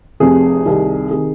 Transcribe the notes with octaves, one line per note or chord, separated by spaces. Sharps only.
F1 F2 C3 G#4
C2 C3 D#3
C3 D#3 G#4